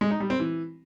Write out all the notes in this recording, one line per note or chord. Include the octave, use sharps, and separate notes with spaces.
G#3
D#4
G3
C4
E3